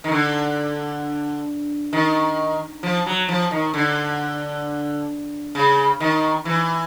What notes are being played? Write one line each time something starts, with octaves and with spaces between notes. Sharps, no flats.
D#3
D3
D#3
F3
F#3
F3
D#3
D3
C#3
D#3
E3